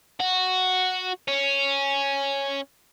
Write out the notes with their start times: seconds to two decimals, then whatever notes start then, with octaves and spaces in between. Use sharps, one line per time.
0.20 F#4
1.28 C#4